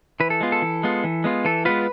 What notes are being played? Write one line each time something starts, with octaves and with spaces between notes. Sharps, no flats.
E3 B4
A4
G#3 B3 F4
A4
E3
G#3 B3 F4
E3
G#3 B3 F4
E3 A4
G#3 B3 F4 B4